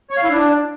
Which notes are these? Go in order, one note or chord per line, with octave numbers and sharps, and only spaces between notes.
C#5
F5
E4
D4